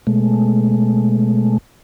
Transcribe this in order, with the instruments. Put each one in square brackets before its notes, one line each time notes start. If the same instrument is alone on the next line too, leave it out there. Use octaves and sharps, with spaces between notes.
[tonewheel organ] B2 G#3 A3